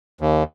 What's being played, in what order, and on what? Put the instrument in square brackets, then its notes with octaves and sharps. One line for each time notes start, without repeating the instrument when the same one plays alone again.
[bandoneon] D#2